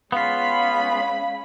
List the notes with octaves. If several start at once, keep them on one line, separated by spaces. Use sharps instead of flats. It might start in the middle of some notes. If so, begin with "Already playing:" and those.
G#3 B3 C#4 F4 F5 B5